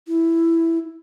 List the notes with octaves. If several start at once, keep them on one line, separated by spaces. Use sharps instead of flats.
E4